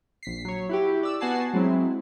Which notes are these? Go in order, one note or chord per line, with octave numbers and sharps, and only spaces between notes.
A#1 B6 C7
F#3 C#5
E4 F#4 G4
D5 E6
B3 F#4 F#5 G#5 A5 C7
F#3 G#3 C4 E4